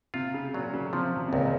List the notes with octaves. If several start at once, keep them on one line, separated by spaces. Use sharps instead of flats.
C3 F4
C#3
A#2 F#3
C#3
C3 F3
C3
C#2 A#2